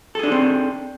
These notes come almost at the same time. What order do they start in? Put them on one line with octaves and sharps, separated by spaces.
A4 G#4 D4 D#4 C4